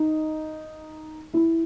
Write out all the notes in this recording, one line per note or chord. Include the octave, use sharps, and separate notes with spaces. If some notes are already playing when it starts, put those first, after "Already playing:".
Already playing: D#4
E4